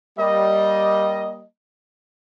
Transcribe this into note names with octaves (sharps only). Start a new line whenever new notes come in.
G3 A#3 D#5